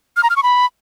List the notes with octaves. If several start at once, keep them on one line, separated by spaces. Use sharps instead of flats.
F6
A#5
F6
C#6
B5